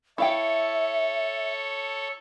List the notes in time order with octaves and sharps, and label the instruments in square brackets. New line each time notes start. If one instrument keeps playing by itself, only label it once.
[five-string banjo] E4 F5 G5 [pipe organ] A4 C#5 [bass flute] E5